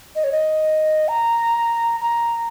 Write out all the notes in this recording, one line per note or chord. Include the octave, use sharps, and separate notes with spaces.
D#5
C#5
D#5
A#5
A#5